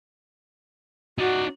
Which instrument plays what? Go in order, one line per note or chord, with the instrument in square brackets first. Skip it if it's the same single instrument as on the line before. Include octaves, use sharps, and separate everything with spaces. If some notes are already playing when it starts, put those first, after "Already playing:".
[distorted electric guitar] D#4 D5 [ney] F#4